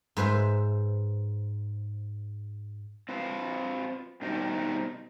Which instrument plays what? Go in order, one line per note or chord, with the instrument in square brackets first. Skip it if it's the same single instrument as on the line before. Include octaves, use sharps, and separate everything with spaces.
[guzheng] G#2 B4 C5 E5
[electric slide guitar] C4 F4 B4
B2 D#3 G3 C4 D#4 A#4